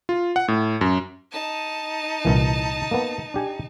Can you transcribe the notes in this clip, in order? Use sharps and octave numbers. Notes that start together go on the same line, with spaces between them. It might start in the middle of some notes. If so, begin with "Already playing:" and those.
F4
F#5
A2
F#2
D#4 A5
C2 A#2 E3
A#3 B3
D4 G4 G#5